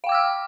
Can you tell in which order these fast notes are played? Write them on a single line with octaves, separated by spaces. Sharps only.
F5 G5 D6 E6 F6